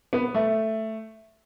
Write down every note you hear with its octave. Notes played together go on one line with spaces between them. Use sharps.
B3
A3